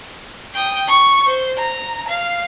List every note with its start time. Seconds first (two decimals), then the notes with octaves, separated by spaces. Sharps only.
0.54 G5 D#6
0.88 C#6
1.26 C5
1.58 A#5
2.09 F5